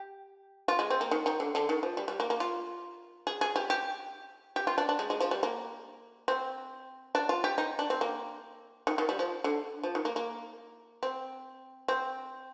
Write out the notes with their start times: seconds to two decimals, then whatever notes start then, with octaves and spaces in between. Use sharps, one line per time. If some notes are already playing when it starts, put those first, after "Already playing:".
Already playing: G4
0.68 F4
0.79 G#3
0.90 C4
1.01 A#3
1.11 D#3
1.26 D#3
1.40 D3
1.55 D3
1.69 D#3
1.83 F3
1.97 G3
2.08 G3
2.20 A#3
2.30 A#3
2.40 F4
3.27 G#4
3.41 G#4
3.56 G4
3.70 G4
4.56 G4
4.67 F4
4.78 D4
4.89 D4
4.99 G#3
5.10 G#3
5.20 F3
5.31 G3
5.43 A#3
6.28 C4
7.15 D4
7.29 F4
7.44 G4
7.58 D#4
7.79 D4
7.90 C4
8.01 A#3
8.87 D#3
8.98 D#3
9.09 G3
9.19 F3
9.44 D3
9.83 F3
9.95 D#3
10.05 A#3
10.16 A#3
11.03 C4
11.88 C4